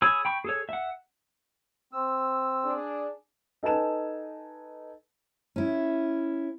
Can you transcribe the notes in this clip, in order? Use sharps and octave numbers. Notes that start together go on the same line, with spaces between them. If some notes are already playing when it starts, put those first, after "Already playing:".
G#4 C#5 B5 E6
G5 B5 C#6
G#4 A4 C#5
E5 F#5
C4 E6
D4 G#4
D#4 A4 B4 G#5 A5 E7
C#4 E4